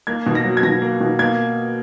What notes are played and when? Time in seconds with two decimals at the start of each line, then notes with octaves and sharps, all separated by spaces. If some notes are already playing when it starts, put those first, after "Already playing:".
0.07 A#3 G#6
0.26 B2
0.35 A#6
0.44 F#3
0.57 G#6
0.63 B2 A#6
0.82 A#3
1.00 B2
1.19 A#3 G#6